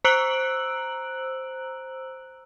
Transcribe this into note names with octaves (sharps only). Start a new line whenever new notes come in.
C5 A#5 E6 F#6 D7 F#7